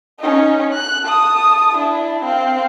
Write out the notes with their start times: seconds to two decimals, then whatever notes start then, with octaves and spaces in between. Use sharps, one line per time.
0.20 C#4 D#4
0.73 F#6
1.04 A5 D#6
1.76 D4 E4
2.24 C4 F5